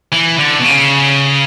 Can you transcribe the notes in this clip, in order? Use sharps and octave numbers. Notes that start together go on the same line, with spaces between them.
E3
D3
B2
C#3